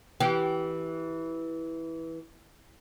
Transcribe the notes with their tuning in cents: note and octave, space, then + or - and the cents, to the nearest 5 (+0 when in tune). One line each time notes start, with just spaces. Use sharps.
E3 -10 G4 -25